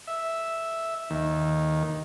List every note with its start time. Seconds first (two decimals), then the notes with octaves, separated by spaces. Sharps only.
0.07 E5
1.10 D#2